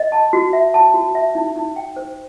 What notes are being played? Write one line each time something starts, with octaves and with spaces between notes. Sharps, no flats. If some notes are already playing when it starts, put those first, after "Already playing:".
Already playing: D#5
A5
F#4
E5
A5
F#4
E5
D#4
D#4
G5
C5